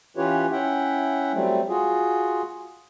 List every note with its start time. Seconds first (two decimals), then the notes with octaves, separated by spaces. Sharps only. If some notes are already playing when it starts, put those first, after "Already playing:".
0.17 E3 C#4 F4 G4 B4 C#5
0.51 C#4 E4 E5 F#5 G5
1.33 F#3 G3 A3 C4
1.69 F4 F#4 G#4